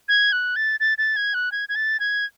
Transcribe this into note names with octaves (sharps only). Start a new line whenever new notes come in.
G#6
F#6
A6
A6
A6
G#6
F#6
G#6
G#6
A6
G#6